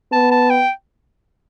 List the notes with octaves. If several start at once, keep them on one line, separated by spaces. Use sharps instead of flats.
B3 A5
A5
G5